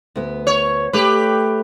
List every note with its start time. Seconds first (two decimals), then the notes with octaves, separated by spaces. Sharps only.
0.16 D2 B3
0.47 C#5
0.93 A3 G4 B4